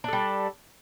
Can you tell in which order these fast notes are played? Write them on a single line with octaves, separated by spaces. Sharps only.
D4 A4 G3